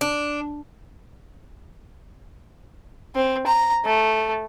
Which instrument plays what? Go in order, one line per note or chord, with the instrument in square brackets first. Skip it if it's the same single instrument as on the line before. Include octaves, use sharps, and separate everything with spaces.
[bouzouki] D4
[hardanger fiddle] C4
A#5
A3